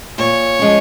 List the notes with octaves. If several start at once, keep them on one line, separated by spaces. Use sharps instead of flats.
A#2 C#5
F3 G#3 C#4